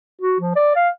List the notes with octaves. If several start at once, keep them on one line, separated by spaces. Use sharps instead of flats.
F#4
F3
D5
F5